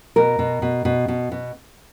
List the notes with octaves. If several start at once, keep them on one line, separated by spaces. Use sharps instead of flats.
B2 A#4
B2
B2
B2
B2
B2